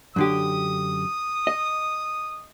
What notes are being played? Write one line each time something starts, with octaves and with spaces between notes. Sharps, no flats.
F#2 D3 G4 D#6
D#5